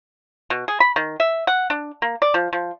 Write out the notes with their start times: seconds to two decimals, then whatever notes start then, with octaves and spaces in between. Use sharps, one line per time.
0.50 B2
0.68 G#4
0.80 B5
0.96 D#3
1.20 E5
1.47 F#5
1.70 D4
2.02 A#3
2.22 D5
2.34 F3
2.53 F3